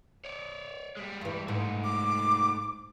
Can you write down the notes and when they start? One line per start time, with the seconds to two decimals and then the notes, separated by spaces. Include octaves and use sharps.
0.25 C#5 D5
0.97 G3 G#3
1.21 G2 E3
1.48 G#2 A3 D#4
1.84 D6